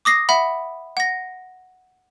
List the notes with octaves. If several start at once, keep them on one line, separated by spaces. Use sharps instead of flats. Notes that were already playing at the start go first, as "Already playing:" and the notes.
D6 D#6 A#6 C7
E5 F#5 B5
F#5 A#6